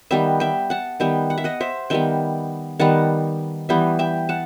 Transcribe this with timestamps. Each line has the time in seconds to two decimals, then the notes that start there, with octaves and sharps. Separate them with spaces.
0.11 D#3 G3 B3 E5 G5
0.40 E5 G5
0.70 F#5 A5
1.00 D#3 G3 B3 E5 G5
1.30 F#5
1.38 E5
1.44 D#5 F#5
1.60 C5 E5
1.90 D#3 G3 B3 E5 G5
2.79 D#3 G3 B3 F#5 A5
3.69 E3 G3 B3 E5 G5
3.99 E5 G5
4.29 F#5 A5